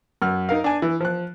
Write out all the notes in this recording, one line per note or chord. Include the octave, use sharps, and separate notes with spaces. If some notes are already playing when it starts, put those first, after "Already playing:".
F#2 F6
D#4 A#4 F5
D4 G#5
E3
F3 F#6